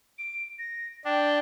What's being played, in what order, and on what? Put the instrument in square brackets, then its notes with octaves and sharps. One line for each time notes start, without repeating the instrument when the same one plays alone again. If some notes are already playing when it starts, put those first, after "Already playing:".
[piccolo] D7
A#6
[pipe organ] D4 [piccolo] G5